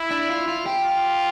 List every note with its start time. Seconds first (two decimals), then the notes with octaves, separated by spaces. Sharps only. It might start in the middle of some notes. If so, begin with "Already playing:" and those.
Already playing: E4
0.11 D4
0.29 F4
0.48 F4
0.66 G4
0.85 F4